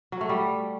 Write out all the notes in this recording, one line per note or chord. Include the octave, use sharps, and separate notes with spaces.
F#3
A3
G3